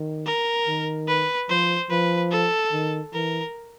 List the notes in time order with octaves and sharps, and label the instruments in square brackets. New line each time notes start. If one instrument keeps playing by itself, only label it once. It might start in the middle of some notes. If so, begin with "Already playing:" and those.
Already playing: [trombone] D#3
[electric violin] A#4
[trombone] D#3
[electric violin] B4
[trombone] F3 [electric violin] C5
[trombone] F3 [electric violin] B4
[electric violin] A4
[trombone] D#3
[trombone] E3 [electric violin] A#4